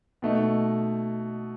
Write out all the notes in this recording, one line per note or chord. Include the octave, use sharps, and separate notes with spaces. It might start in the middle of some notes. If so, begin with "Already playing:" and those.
B2 A3 D#4